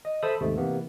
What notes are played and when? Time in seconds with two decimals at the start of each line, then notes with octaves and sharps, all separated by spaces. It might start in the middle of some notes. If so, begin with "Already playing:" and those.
0.05 D#5
0.23 A4 C5 E5 A5 B5 D#6
0.41 D#2 G#2 C3 A3
0.57 C3 E3 A#3 B3